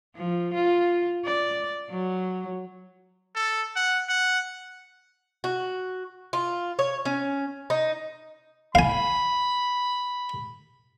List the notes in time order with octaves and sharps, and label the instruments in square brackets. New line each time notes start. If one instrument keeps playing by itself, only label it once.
[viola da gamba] F3
F4
D5
F#3
[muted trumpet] A4
F#5
F#5
[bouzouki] F#4
F4
C#5
C#4
D#4
[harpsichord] F5 G#5 [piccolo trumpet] B5